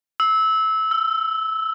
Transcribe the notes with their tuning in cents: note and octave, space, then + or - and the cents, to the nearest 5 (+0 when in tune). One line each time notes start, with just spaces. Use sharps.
E6 -20
E6 +20